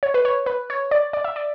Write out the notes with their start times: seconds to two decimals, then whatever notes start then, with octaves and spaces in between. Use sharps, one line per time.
0.03 C#5
0.14 B4
0.25 C#5
0.46 B4
0.70 C#5
0.91 D5
1.13 D5
1.24 E5
1.36 D5